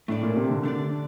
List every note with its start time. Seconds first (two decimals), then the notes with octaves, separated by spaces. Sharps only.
0.08 A2 A3 D4 A4 D5
0.23 A#2
0.36 C3
0.50 D3
0.63 D3 A3 D4 A4 D5